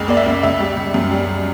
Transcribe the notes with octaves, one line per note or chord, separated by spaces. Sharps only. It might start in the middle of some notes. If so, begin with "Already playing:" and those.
Already playing: F#1 C#2
A#3 D5
E5
C#2
C#2 E5
G3
C#2
F#2
G3